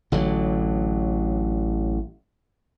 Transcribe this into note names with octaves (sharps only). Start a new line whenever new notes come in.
A1 D3 F#3